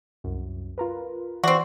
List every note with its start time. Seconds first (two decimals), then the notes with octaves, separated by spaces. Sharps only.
0.24 C2 F#2
0.78 F4 A#4 B4
1.44 E3 C4 F#4 D5 C7